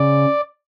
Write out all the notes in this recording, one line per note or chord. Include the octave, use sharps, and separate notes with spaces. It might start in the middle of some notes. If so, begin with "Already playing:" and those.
Already playing: C#3 D5